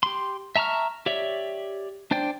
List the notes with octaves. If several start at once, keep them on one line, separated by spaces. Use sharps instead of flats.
G4 C6
E5 A5 A#5 C#6 F6
G4 C#5 D5 E5
D4 C5 D5 G5